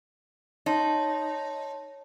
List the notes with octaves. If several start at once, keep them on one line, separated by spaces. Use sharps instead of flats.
D#4 C#5 A5 C6